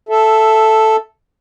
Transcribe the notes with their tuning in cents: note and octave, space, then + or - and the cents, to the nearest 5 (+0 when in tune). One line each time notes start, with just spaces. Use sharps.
A4 +0 E5 +10